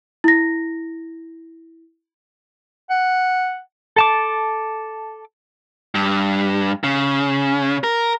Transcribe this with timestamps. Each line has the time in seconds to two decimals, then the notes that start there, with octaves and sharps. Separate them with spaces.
0.24 E4 A#6
2.90 F#5
3.96 A4 A5 D6
5.95 G2
6.84 C#3
7.84 A#4